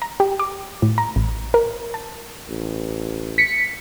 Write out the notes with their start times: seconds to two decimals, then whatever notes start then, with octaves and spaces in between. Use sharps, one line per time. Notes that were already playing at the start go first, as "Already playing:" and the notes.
0.02 A#5
0.20 G4
0.40 D6
0.82 A2
0.98 A#5
1.16 A1
1.54 A#4
1.94 A5
2.48 A1
3.38 B6 C#7